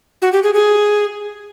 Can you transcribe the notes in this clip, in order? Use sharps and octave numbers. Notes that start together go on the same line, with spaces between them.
F#4
G4
G#4
G#4